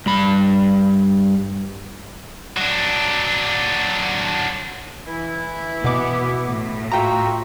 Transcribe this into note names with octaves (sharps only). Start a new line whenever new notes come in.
G2 B5
F#3 D4
E3 E4
B2 B3 D6
A2
F4 F#4 E5 G5 A#5